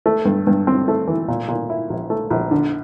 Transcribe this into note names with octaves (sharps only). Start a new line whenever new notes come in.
A3
G2
G2
C4
A3
E3
A#2
A#2
E4
A#1
A3
A#1
D3